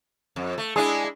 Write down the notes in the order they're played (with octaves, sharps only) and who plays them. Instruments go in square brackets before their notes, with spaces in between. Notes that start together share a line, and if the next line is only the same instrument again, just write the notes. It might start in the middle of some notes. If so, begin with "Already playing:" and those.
[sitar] F2
A3
[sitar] G#3 D4 E4 [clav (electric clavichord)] G#4